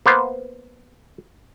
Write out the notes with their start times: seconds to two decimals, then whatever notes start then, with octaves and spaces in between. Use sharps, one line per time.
0.06 A#3 B3 C5